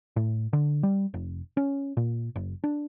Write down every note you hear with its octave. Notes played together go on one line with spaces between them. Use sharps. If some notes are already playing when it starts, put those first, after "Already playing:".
A2
D3
G3
F1
C#4
A#2
F#1
D4